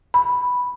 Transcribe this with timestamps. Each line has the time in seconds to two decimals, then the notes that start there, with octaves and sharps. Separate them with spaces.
0.14 B5